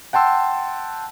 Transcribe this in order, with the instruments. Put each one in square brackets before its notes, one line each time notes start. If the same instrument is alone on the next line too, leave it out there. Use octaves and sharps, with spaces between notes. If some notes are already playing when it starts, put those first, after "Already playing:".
[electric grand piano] F#5 G5 A5 C6 E6